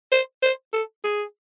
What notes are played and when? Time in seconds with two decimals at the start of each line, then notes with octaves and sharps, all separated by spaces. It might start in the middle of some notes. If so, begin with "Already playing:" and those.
0.12 C5
0.42 C5
0.73 A4
1.04 G#4